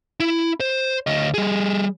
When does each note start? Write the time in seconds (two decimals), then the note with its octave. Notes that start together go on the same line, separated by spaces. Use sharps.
0.20 E4
0.60 C5
1.07 D2 D#5
1.34 G3 G#4